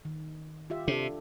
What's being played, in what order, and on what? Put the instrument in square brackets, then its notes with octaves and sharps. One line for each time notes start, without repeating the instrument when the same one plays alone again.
[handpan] D#3
F4 G4 E5
[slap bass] C3 [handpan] D4 A4